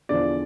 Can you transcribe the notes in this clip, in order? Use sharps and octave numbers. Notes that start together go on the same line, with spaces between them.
E2 D3 F3 D5